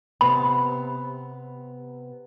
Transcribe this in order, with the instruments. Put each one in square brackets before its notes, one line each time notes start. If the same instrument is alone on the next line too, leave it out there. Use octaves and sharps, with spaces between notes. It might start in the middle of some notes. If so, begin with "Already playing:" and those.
[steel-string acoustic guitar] C3 B3 [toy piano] B5